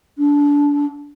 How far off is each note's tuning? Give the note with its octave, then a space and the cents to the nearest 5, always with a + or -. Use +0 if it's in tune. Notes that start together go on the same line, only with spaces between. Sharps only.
D4 -25